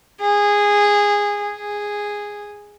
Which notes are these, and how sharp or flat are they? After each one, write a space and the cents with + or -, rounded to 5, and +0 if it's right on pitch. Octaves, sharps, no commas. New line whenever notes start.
G#4 -15
G#4 -5